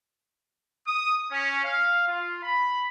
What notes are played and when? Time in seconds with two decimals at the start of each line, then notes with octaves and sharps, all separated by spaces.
0.87 D#6
1.32 C#4
1.65 F5
2.08 F4
2.43 B5